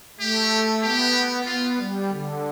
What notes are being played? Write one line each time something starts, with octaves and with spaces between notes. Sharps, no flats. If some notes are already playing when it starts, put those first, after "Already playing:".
A3 G4
B3 G4
B3 F4
G3
D3